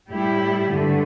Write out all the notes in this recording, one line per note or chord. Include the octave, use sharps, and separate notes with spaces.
A2 G3 E4 G4
G2 D3 A3